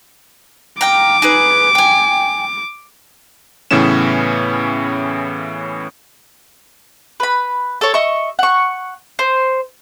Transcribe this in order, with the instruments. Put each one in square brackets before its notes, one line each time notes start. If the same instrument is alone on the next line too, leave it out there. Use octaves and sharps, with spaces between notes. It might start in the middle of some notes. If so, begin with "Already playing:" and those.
[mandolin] F5 G5 A#5 [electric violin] D6
[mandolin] D#4 G#4 B4
G5 G#5
[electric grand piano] A2 C#3 E3 B3 C#4 E7
[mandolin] B4 B5
A4 C#5
D#5 E5 C#6
F#5 C#6
C5